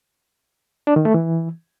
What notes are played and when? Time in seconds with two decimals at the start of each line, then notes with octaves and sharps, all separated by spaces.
0.87 D4
0.96 D#3
1.05 A3
1.14 E3